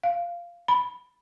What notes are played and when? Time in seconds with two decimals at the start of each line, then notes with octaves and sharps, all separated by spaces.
0.03 F5
0.68 B5